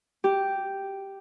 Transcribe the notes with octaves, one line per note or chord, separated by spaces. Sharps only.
G4